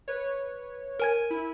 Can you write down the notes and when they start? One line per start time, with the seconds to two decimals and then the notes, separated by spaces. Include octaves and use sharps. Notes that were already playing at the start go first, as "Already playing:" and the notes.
0.08 B4 C#5
1.00 A#4 G#5 G#6
1.30 E4